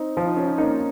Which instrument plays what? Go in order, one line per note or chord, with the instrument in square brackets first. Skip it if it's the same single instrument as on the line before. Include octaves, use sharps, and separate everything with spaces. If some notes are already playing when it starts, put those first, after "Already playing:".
Already playing: [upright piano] C4 D#4
[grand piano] F3 [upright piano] F4
[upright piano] D#4
C#4
C4 D#4
[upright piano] A#3 C#4 [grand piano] D#4